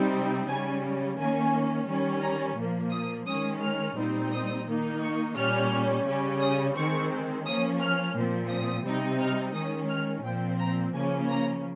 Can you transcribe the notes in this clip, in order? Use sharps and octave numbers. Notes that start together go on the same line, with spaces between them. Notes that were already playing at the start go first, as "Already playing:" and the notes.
Already playing: C3 G3 C4 D#4
G5
C#3 G3 C#4 G#5
D#3 A#3 C#4 G#5
D#3 G3 C#4
A#5
A#2 F3 A#3
D#6
D#3 G#3 C#4 D#6
F6
A#2 G3 C4 D#4
D#6
D#3 A#3 D#4
C#6
A#2 G3 C#4 F6
C#3 G3 C#4
D#6
D#3 G#3 C4 C#6
F3 A#3 C#4 D#6
F6
A#2 F3 C4
D#6
C3 G3 C4 D#4
F6
D#3 G#3 C#4 D#6
F6
A#2 F3 C4 G5
A#5
C#3 F3 A#3 C#4 G#5
A#5